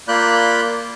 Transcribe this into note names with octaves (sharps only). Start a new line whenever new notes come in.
A#3 F4 D5 B5 F#6 G6